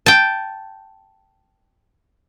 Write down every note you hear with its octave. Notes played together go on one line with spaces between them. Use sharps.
G5 A5